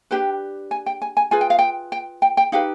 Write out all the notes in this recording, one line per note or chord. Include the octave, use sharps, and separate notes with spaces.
D4 G4 B4 G5
G#5
G5
G#5
G#5
F4 G#4 B4 G#5
G5
F5
G5
G5
G5
G5
D#4 G4 B4 F5